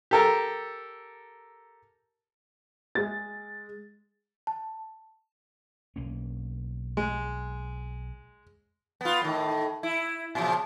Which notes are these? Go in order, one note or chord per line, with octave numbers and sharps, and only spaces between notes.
G4 A4 A#4
G#3 A6
A5
B1 A#3 C#4
G#3
B3 F4
A2 D#3
E4
A#2 C#3 F3